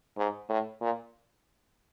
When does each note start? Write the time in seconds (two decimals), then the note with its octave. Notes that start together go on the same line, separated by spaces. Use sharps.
0.18 G#2
0.49 A2
0.81 A#2